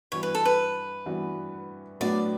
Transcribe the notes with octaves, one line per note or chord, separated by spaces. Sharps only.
G2 E3 B3 F#4 C#5
B4
A4
B4
G2 E3 B3 F#4
A2 F#3 B3 D4 F#4 D5